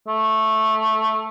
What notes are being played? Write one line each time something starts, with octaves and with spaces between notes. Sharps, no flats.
A3